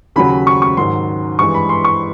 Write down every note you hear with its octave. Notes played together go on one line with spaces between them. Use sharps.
D#2 C#3 F#3 B5
C#6
C#6
G#2 D#3 F#3 C6
G2 E3 G#3 C#6
B5
C6
C#6